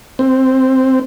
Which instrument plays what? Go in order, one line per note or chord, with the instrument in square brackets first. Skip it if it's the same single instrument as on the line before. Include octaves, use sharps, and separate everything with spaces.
[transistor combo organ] C4